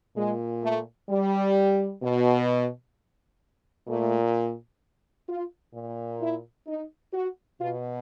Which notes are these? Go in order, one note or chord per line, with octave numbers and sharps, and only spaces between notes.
A#2 G#3
A3
G3
B2
A#2 A3
F4
A#2
E4
D#4
F#4
B2 F4